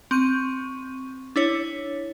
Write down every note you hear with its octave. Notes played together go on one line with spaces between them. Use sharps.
C4 C#6 D#7
D4 E4 C#5